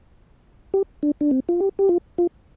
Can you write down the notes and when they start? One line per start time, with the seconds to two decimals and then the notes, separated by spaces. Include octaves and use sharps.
0.74 G4
1.03 D4
1.21 D4
1.31 C4
1.49 F4
1.60 G4
1.79 G4
1.89 F4
2.18 F4